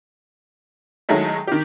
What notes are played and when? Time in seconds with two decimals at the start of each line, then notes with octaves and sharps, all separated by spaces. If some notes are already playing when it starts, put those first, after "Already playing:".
1.09 D#3 F#3 G#3 A3 E4
1.47 D#3 G4